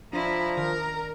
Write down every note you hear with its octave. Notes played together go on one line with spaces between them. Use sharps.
F3 D4 E4 A#5
D#3 A#4